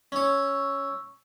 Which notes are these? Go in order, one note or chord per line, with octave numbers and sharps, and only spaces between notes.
C#4 C#5 C#6 E6